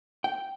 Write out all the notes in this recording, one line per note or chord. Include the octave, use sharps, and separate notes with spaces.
G5